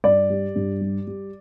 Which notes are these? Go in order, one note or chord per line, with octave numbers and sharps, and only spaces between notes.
G2 D5
G3
G2
G3
G3